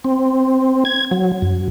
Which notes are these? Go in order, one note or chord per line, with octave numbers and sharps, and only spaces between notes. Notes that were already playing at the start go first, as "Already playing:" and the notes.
C4
G#6
F#3
F#2